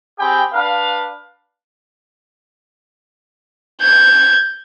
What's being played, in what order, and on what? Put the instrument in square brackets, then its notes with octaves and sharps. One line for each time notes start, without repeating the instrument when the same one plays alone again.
[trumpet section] C4 G4 G#4 G5 B5
D4 B4 F5
[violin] G6 G#6